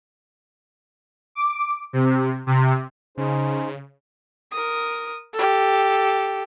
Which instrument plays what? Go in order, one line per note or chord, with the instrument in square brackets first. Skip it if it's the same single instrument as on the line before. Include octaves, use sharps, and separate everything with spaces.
[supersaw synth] D6
C3
C3
[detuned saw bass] C#3 [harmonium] D#4 G#4 C5
[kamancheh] A#4 D#6
G4 A4